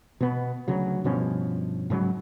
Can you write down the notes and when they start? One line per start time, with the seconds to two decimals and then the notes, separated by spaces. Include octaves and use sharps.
0.21 B2 B3
0.68 D2 C#3 F#3
1.04 G2 B2 F3 C#4
1.90 G#2 C#3 F#3